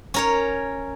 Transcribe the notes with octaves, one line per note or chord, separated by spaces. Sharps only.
C#4 A#4 C#5